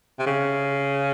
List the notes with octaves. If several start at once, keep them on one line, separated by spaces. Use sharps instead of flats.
C3
C#3